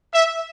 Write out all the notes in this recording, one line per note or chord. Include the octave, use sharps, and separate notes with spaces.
E5